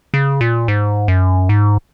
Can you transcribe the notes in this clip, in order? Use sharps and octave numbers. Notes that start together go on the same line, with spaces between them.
C#3
A#2
G#2
F#2
G#2